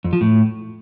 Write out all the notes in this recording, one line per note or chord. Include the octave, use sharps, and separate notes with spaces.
F2
F3
A2